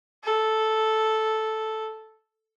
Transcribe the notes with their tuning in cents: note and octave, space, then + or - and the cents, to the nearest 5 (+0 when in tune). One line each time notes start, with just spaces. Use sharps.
A4 -5